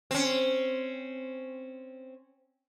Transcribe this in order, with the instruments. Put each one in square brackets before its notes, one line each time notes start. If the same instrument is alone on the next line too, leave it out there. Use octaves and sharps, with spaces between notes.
[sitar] C4 C#4